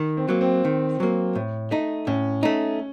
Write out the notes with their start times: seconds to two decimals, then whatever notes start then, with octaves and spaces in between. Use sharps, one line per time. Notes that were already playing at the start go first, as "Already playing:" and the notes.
Already playing: D#3
0.17 C4
0.29 F#3 A#3
0.41 C4
0.65 D#3
1.00 F#3 A#3
1.35 A2
1.71 A3 D#4
2.07 A2 C#4
2.43 A3 D#4